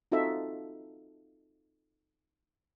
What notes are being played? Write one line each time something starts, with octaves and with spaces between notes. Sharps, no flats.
C4 D#4 F4 F#4 A4 E5